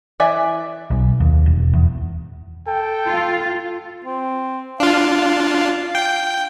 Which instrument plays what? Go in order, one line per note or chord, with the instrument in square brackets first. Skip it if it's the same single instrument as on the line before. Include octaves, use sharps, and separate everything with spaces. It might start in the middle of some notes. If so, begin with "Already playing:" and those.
[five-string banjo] E3 D5 E5 G#5
[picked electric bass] B1
D#2
E1
E2
[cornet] A4 [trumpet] G5
[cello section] F4
[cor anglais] C4
[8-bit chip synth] D4 F4 [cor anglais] F5
[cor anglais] F5
[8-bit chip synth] G5